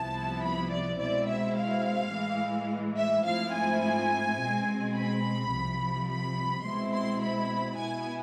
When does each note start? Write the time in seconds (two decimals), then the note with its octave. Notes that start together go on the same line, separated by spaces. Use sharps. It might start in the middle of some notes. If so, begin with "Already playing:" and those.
Already playing: C2 C3 F3 B3 E4 A5
0.44 B5
0.71 D5
0.99 B2 G#3 C4 E4 D5
1.28 E5
1.56 F5
2.13 A2 E3 G#3
2.97 E5
3.25 G#2 F3 A3 C4 E4 F5
3.54 G#5
4.38 B2 G#3 C4
4.95 B5
5.52 C2 C3 F3
6.09 B5
6.64 B2 G#3 C4 E4 C6
6.93 C6
7.22 B5
7.77 B2 B3 E4 G#5